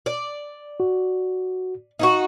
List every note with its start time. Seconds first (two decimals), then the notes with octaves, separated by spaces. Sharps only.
0.06 D5
0.80 F#4
1.99 D#4 E4 F#4